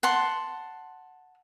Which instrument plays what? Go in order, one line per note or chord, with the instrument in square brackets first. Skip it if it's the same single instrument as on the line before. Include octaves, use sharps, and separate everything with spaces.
[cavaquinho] F#5 A5 C6